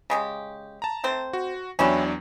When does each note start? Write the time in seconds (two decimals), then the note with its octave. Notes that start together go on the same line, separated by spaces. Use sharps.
0.10 C#3 G#3 G4
0.82 A5 A#5
1.04 A3 C4 C5
1.33 F#4
1.79 E2 F#3 C#4 D4 E4 G4